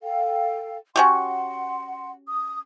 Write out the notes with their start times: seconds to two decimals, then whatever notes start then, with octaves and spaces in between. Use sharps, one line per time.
0.02 A4 F5 G5
0.96 C#4 F#4 G4 F#5 C6
2.27 D#6